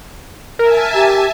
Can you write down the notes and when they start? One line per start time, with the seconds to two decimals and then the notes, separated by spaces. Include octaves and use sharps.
0.59 A#4 E5 G#5 A5
0.94 G4